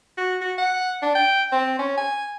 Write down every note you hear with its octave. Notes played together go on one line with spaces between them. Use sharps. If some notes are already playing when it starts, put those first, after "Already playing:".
F#4
F#4
F#5
D4
G5
C4
C#4
G#5